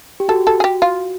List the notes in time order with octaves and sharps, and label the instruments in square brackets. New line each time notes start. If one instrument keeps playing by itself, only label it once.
[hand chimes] G4
[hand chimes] F#4 [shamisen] A4
[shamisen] A4
G#4
G4
F4